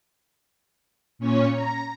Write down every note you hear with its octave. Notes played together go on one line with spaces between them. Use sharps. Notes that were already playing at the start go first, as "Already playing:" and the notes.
A#2 C#4 C#5
A#5